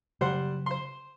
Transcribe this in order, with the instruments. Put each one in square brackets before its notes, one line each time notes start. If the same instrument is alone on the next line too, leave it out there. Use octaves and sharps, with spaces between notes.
[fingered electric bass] C#3 F#3 [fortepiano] G3 C5 F#5
[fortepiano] C5 C6